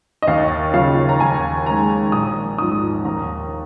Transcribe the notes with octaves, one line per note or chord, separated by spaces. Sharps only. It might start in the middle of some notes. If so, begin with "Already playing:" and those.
D#5
D#2 F5
C#3 F3 F5
A#5
D#2 G#5
D#3 G#3 A#5
A#1 D#6
G#2 F3 D#6
D#2 A#5